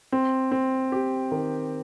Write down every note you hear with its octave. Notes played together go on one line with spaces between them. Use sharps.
C4
C4
G4
D#3